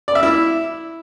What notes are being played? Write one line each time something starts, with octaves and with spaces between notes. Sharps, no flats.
D5
E5
E4